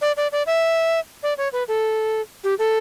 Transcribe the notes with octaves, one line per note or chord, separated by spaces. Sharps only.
D5
D5
D5
E5
D5
C#5
B4
A4
G4
A4